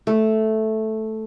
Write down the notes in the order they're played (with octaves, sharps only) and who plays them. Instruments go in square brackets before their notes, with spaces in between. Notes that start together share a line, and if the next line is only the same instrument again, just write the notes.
[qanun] A3